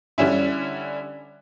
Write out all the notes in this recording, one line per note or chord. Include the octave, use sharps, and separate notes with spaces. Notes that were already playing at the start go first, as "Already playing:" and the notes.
D3 G3 C#4 E4